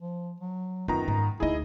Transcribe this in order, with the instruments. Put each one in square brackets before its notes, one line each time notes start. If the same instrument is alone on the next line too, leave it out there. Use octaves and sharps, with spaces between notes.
[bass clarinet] F3
F#3
[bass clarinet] F#2 [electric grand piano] D#3 B3 A#5 [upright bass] F4
[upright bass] G#2
[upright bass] D2 D#4 [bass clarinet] E4 [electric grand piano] G#4 D#5